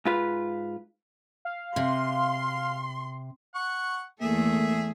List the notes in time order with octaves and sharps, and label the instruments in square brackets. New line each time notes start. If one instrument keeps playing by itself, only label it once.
[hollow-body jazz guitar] G#2 F4 B4
[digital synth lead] F5
[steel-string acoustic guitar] C3 [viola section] C6
[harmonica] F#5 C#6
[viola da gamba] E2 A3 A4 [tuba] A#3 [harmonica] G#4 E5